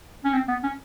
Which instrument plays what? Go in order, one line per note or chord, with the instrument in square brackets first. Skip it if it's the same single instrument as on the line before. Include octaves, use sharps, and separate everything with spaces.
[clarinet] C#4
C4
B3
C#4